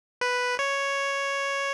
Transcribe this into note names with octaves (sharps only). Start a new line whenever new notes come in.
B4
C#5